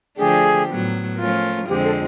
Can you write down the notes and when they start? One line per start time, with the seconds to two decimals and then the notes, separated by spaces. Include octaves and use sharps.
0.18 D3 F3 A3 D4 G4 G#4
0.68 A2 F#3 B3
1.18 F3 A3 C#4 F4 A#4
1.68 F2 D3 F3 G#3 C4 G4
1.84 A4